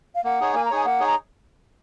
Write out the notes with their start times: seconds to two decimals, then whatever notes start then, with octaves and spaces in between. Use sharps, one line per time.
0.15 F5
0.24 A#3 F#5
0.40 D#4 G#4 C#5
0.54 A#3 G#5
0.65 A#5
0.71 D#4 G#4 C#5 G#5
0.85 A#3 F#5
1.00 D#4 G#4 C#5
1.07 A#5